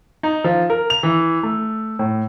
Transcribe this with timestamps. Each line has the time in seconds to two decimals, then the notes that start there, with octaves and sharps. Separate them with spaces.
0.23 D#4
0.44 F3
0.70 A#4
0.90 F7
1.03 E3
1.43 A3
1.99 A2